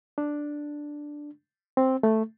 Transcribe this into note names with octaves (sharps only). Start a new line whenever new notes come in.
D4
C4
A3